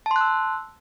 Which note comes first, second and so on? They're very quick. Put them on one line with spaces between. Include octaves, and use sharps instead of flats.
A5 C6 F#6 E6